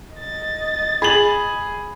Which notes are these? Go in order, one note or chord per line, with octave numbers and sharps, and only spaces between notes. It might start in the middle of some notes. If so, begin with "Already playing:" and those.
D#5 A6
G#4 B5 F#7